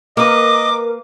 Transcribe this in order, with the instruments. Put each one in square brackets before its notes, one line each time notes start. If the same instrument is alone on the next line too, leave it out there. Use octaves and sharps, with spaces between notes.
[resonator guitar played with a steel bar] A#3 B4 [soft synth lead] A#4 [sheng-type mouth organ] D#5 [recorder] D6